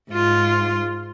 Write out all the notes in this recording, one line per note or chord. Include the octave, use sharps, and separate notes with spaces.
G#2 F4